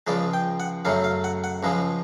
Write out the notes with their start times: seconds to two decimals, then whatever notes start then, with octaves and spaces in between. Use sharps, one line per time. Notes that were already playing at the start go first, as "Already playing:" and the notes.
0.07 C#2 C#3 F3 G#3 D5
0.34 G5
0.60 F#5
0.85 F#2 C#3 F#3 A3 F5
1.04 F5
1.24 F#5
1.44 F#5
1.63 C#2 C#3 F3 G#3